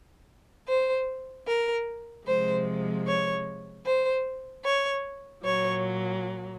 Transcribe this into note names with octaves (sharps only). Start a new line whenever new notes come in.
C5
A#4
C3 F3 G#3 C5
C#5
C5
C#5
A#2 F#3 C#5